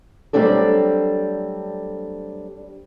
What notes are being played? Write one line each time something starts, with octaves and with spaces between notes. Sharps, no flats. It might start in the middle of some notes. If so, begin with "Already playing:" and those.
F#3 G3 A3 C4 D4 A4